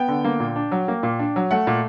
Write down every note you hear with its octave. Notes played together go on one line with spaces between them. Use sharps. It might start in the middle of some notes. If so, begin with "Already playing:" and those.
Already playing: B3 G5
D3
A#3
A#2
D4
F#3
A#3
A#2
D4
F#3
A3 F#5
A#2